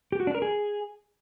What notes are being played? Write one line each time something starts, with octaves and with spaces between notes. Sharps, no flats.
G4
F#4
D4
A#4
G#4